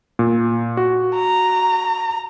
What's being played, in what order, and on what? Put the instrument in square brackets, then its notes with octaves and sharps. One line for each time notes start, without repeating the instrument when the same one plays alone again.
[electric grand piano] A#2
F#4
[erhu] A#5